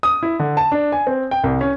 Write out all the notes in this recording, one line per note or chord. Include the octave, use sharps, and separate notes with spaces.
D#6
E4
D3
A5
D4
G#5
C4
G5
C2
C#4